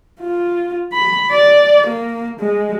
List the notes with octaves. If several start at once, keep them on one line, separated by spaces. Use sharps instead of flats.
F4
B5
D5
A#3
G#3